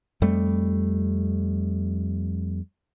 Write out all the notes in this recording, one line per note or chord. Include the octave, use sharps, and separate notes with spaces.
F2 G3 A3